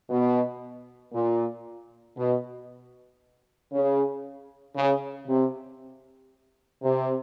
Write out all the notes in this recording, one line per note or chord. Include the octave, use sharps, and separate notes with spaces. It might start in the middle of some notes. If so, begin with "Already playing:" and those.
B2
A#2
B2
C#3
C#3
C3
C3